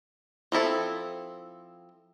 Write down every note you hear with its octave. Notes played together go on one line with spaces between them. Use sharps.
F3 C4 E4 A4